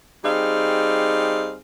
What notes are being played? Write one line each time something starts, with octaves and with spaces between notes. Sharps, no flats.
G3 C4 D#4 G#4 F5